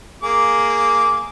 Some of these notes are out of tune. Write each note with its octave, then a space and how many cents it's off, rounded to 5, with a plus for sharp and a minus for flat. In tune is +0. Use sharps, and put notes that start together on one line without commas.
A#3 -5 G#4 +0 D6 -10